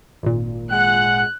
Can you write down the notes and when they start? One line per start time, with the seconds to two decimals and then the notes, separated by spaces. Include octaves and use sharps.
0.23 G#1 A#2
0.71 G#3 F#5 F#6